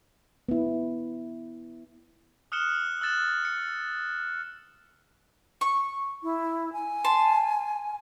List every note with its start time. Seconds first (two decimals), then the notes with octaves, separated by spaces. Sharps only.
0.49 B3 E4
2.52 D#6 F6 F#6 C#7 E7 G7
3.01 E6 F#6 A6 E7 F#7
3.45 C#7
5.61 C#6
6.23 E4
6.73 G#5
7.05 A5 C6